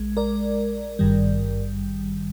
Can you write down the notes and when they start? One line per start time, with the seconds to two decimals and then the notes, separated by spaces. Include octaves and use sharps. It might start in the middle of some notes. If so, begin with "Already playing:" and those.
Already playing: A#1 G#3
0.17 A#4 D5
0.99 G#1 G2 D#3 G3